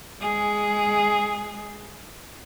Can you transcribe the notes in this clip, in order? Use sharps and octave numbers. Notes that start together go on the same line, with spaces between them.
G#3 G#4